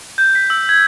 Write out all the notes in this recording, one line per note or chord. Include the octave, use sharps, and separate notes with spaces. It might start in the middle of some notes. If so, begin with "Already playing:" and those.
G6
B6
E6
G#6